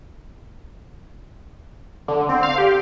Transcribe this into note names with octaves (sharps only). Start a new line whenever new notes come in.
D3
C4
F5
G4